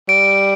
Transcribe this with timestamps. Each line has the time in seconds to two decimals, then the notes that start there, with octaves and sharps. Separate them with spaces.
0.09 G3 D7